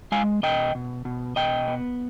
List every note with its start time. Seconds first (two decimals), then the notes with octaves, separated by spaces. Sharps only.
0.12 G#3 F5 G#5
0.43 B2 D#5 G5
0.75 B2
1.05 B2
1.36 B2 D#5 G5
1.68 B3